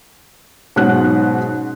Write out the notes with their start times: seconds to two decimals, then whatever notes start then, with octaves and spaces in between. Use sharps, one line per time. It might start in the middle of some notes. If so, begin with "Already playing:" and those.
0.76 G#2 B2 F#3 C#4 F#5 F#6